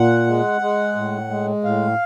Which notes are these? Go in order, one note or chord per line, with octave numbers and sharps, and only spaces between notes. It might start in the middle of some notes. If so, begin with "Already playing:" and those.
Already playing: A#2 F#5
G#3
G#3
A2
G#3
A2 F5